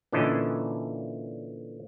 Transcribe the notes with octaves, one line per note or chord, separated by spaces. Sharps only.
A#2 D3 E3 C#4 D#5 A5